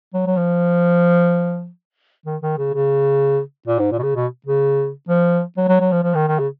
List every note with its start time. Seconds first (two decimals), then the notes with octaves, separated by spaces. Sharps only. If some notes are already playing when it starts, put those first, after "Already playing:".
0.14 F#3
0.27 F#3
0.37 F3
2.26 D#3
2.42 D#3
2.58 C#3
2.74 C#3
3.68 A#2
3.79 G#2
3.92 A#2
3.99 B2
4.03 C#3
4.16 B2
4.46 C#3
5.09 F3
5.57 F#3
5.69 F#3
5.80 F#3
5.92 F3
6.03 F3
6.15 D#3
6.28 D#3
6.39 C#3